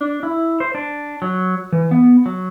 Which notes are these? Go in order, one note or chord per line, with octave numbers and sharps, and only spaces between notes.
D4
E4
C5
D4
F#3
E3
B3
F#3